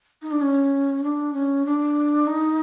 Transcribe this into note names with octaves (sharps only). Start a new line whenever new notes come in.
D#4
D4
C#4
D4
C#4
D4
D#4